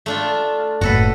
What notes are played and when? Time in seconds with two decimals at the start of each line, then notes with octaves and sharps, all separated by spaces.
0.06 A3 D4 F4
0.81 F#1 A2 F#4 A4 B4